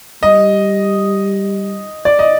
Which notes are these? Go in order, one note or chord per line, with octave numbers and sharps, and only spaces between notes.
G3 D#5
D5
D#5